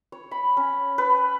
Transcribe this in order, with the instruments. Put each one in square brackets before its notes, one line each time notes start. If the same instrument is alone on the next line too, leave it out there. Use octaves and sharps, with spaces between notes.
[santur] C#5
B5
C#4
B4